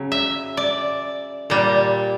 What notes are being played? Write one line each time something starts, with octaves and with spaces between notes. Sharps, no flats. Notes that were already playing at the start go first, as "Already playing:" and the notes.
Already playing: C#3 F#3
E5
D5
A#2 G3